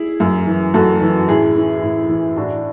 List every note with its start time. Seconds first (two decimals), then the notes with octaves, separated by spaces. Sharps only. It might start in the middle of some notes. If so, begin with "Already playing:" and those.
Already playing: E4 G#4
0.20 F#2
0.47 E3
0.74 F#2 F#4 A4
1.02 E3
1.28 A2 E4 G#4
1.56 E3
1.82 A2
2.09 E3
2.36 A2 D4 F#4